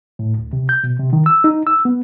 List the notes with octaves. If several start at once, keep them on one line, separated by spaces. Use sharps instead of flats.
A2
D2
C3
G6
B2
C3
D#3
E6
D#4
E6
B3